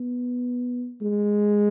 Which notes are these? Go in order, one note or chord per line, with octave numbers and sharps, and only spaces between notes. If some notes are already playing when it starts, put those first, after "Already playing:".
Already playing: B3
G#3